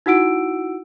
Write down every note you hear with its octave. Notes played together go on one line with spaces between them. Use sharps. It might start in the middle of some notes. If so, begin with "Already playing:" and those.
D#4 E4 F#4 F#5 E6 D7